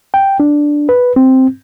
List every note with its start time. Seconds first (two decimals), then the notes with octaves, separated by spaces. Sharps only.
0.14 G5
0.40 D4
0.89 B4
1.16 C4